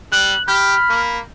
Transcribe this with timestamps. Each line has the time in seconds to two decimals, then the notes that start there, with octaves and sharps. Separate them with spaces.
0.12 G3 F#6 F#7
0.48 G4 B5 F6 G6
0.89 A#3